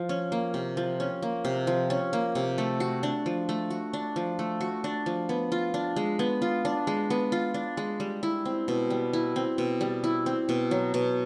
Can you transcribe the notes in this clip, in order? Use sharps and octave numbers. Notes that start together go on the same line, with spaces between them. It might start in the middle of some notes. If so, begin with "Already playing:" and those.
Already playing: F3
C#4
A#3
C3
F3
C#4
A#3
C3
F3
C#4
A#3
C3
A3
F#4
D4
F3
A3
F#4
D4
F3
A3
F#4
D4
F3
B3
F4
D4
G#3
B3
F4
D4
G#3
B3
F4
D4
G#3
G3
E4
C4
B2
G3
E4
C4
B2
G3
E4
C4
B2
F#3
B2